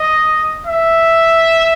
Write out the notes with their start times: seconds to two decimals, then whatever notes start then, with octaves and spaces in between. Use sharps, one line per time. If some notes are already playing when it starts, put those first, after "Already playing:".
Already playing: D#5
0.67 E5